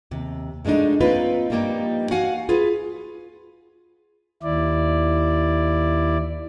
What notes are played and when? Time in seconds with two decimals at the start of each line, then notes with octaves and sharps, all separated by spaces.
0.11 D#2 C3
0.65 F3 G#3 A3 D4 D#4
1.00 A#3 C4 D#4 F4 B4
1.50 G2 F3 G3 A#3 D#4
2.11 F#4 F5 F#5 G#5
2.49 F4 G#4 B4
4.43 D#2 E4 D5